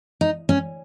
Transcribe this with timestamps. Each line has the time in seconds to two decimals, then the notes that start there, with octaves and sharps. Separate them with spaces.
0.21 D#4
0.49 C#4